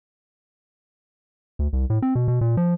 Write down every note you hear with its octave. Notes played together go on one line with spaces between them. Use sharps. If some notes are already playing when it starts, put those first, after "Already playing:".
D2
C2
A2
C4
B2
B2
A#2
F3